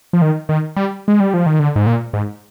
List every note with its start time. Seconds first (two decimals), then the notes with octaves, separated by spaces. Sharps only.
0.13 F3
0.22 D#3
0.49 D#3
0.76 G3
1.08 G#3
1.20 G3
1.34 F3
1.46 D#3
1.59 D3
1.76 G#2
1.86 A#2
2.13 G#2